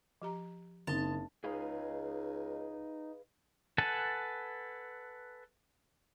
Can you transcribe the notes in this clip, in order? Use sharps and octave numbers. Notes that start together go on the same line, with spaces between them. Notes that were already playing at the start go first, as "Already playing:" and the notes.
F3 G4 A#5
F#1 C4 D#4 A5
C#2 D#4 G#4 B4 F5
A4 B4 F#5 G#5 A5